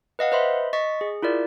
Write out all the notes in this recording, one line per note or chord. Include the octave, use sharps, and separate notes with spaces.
B4 D#5 F5 F#5
B4 C5 D#5 E5 B5 C6
D#5 C#6 A6 B6
G#4
E4 F4 A#4 D5